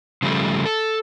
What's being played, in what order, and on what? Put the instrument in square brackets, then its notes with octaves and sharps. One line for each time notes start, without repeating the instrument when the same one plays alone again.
[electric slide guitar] C#3 F3 G3 A3
A4